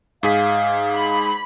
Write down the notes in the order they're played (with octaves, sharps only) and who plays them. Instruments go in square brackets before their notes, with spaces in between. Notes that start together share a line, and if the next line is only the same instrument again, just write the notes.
[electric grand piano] G#2 G#4 B6 [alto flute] F5
[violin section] B5